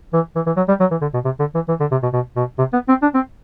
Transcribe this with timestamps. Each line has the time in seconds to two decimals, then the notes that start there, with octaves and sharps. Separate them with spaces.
0.13 E3
0.35 E3
0.46 E3
0.57 F#3
0.68 G3
0.80 F#3
0.91 E3
1.01 D3
1.13 B2
1.25 C3
1.39 D3
1.55 E3
1.68 E3
1.80 D3
1.91 C3
2.03 B2
2.13 B2
2.36 B2
2.58 C3
2.73 B3
2.88 C4
3.02 D4
3.14 C4